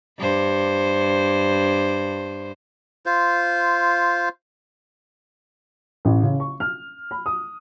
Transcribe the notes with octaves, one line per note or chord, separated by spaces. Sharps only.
G2 C5
F4 C5
A1
C#3
C#6
F6
B5
D#6